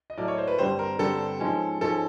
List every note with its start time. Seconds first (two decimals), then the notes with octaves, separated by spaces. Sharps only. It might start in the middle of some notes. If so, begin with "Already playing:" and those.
0.10 D#5
0.17 A2 F#3 A#3 D4 D5
0.28 C#5
0.38 C5
0.47 B4
0.58 G2 D3 G3 C4 C5
0.79 A#4
0.99 G2 D3 G3 C4 A4
1.40 G#2 F3 G#3 C#4
1.81 G#2 F3 G#3 C#4 A4